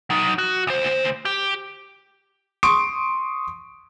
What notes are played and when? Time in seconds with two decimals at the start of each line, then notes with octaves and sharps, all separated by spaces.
0.10 F#3 D#4
0.38 F#4
0.67 D2 C5
1.25 G4
2.63 C6 C#6 D#6 D7